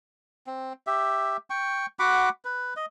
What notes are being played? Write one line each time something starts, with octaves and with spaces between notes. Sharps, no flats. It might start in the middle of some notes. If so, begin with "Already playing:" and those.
C4
G4 E5
G5 C#6
F#4 F#5 B5 D6
B4
D#5